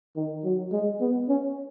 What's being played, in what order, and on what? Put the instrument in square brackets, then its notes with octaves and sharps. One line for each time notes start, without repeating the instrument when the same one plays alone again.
[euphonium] D#3
F#3
G#3
B3
C#4